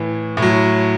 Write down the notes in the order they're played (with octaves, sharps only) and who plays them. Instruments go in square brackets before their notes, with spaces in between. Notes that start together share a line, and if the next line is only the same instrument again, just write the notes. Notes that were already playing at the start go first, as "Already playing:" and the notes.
Already playing: [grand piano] A2 E3
A2
F#3